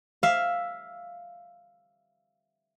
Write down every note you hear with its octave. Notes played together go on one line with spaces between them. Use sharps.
E5 F5